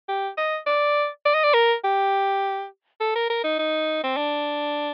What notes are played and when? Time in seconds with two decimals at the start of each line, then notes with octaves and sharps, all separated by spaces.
0.09 G4
0.37 D#5
0.67 D5
1.25 D5
1.34 D#5
1.44 D5
1.54 A#4
1.84 G4
3.01 A4
3.16 A#4
3.30 A#4
3.44 D#4
3.59 D#4
4.04 C4
4.17 D4